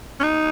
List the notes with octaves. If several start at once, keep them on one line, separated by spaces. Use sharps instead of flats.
C#4
D#4